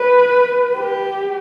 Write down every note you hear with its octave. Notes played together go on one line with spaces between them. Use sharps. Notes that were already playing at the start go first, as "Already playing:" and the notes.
Already playing: B4
G4